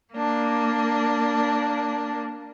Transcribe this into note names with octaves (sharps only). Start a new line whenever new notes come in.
A#3 D4